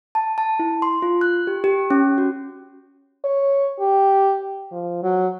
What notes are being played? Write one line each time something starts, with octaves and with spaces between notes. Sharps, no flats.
A5
A5
E4
C6
F4
F#6
G4
G4
C#4
F#4
C#5
G4
F3
F#3